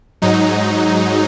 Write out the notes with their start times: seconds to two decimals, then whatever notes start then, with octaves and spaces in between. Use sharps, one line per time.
0.22 G#2 F#3 D#4